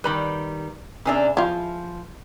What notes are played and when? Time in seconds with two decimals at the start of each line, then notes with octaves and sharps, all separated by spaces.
0.04 D#3 G3 B4 B5
1.05 C3 E3 C#4 D4 G#4 E5
1.37 F3 E4 F4